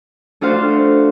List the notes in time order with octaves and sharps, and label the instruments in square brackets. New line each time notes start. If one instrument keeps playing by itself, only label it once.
[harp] A3 D4 F4 F#4 C5 F5